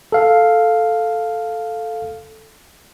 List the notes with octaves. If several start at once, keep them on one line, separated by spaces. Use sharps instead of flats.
A4 F5